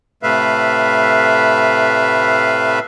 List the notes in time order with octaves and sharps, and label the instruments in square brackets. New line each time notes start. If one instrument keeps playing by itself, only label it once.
[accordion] A2 C3 A3 B4 E5 F5